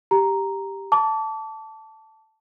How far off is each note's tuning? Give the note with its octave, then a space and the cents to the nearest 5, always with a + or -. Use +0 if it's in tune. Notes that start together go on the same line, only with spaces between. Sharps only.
G4 +0 A#5 +0
A5 +0 D6 -35